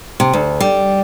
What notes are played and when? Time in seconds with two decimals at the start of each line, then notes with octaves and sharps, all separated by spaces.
0.20 C3
0.33 D2
0.60 G3